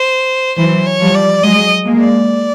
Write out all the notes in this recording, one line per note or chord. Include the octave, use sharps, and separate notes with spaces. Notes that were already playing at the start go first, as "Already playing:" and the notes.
Already playing: C5
E3 F#3 C5
C#5
F3 G3
D5
F#3 G#3 D#5
G#3 A#3
D5